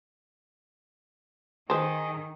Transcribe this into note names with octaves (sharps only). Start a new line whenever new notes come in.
D#3 G#4 B4 C5 D#5